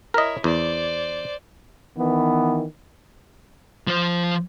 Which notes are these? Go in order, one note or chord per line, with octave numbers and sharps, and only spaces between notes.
E4 A#4 C#5 D#5
E2 C5 D5
D#3 E3 B3
F3 C5